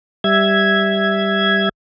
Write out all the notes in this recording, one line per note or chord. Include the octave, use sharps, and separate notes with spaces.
G3 E5 G#6